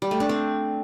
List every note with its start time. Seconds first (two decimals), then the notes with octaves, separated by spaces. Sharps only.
0.02 G3
0.11 A3
0.20 D4
0.29 C4